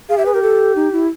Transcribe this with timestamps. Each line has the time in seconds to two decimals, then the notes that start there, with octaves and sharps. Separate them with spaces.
0.09 G#4 F5
0.18 G4 E5
0.26 G#4 B4
0.34 G4 A#4
0.42 A4
0.76 D#4
0.92 E4